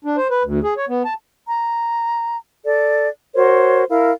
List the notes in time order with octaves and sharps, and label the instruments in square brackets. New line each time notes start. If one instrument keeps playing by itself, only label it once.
[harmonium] D4
C5
B4
D2
G#4
C#5
B3
A5
[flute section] A#5
A4 D5
F#4 A#4 C5 C#5
E4 A#4 F5